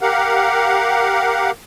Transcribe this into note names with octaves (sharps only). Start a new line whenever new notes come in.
G4 A#4 F5 F#5